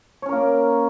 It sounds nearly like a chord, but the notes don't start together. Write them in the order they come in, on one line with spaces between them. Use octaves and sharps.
C#5 C#4 A#4 A#3